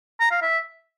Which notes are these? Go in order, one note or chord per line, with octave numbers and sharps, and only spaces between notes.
A#5
F5
E5